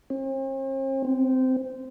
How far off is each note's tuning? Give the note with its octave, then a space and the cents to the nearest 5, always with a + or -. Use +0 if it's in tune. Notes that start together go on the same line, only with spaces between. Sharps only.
C4 +45
C4 -15